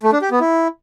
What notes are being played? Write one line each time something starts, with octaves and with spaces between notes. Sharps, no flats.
A3
D4
G4
B3
E4